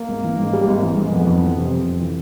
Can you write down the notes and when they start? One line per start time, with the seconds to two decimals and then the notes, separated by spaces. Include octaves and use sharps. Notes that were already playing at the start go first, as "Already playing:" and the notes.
Already playing: A#3
0.09 G#1
0.24 E3
0.39 G#2
0.53 G3
0.68 G#1
0.83 E3
0.97 G#2
1.12 F2 B3
1.27 F2
1.42 E3
1.57 C3
1.71 F2 C4
1.86 F2
2.01 E3